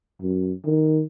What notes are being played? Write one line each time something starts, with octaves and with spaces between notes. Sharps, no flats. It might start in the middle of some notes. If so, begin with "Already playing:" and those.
F#2
D#3